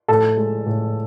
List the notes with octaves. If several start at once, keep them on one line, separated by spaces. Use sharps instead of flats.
A2 A4 A5
G#3
A2